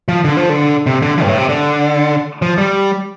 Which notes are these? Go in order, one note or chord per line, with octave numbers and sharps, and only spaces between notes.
F3
D3
F3
D3
C3
D3
F3
G2
A2
C3
D3
F3
G3